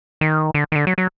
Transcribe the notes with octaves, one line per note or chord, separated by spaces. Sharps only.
D#3
D3
D#3
D3
F#3
F#3